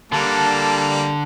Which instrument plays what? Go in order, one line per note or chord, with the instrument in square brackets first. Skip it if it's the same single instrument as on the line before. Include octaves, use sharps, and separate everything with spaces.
[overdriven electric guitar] D3 [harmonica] G3 A#3 [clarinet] A5